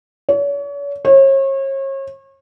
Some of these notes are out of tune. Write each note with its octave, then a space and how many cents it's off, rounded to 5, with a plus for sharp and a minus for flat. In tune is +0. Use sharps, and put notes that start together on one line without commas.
C#5 +40
C#5 -35